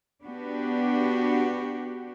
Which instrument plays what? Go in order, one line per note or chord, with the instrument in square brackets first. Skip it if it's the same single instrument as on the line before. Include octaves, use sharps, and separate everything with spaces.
[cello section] B3 D4 F#4 G4